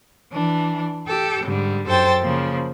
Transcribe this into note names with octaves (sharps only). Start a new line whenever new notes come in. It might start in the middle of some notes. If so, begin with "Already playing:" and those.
E3 D4
G4 A4 G5
G#2 D3 G3
F#2 A4 C5 G5 A6
C#3 F3 A#3